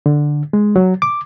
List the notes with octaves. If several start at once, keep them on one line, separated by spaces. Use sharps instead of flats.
D3
G#3
F#3
D6